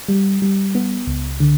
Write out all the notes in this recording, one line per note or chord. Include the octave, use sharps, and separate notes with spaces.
G3
G3
B3
C#2
D3